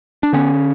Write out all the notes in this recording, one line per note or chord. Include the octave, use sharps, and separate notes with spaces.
D4
D3 B3 C#4